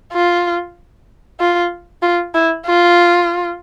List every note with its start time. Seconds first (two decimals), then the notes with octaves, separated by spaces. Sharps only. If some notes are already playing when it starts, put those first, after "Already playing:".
0.13 F4
1.40 F4
2.02 F4
2.34 E4
2.66 F4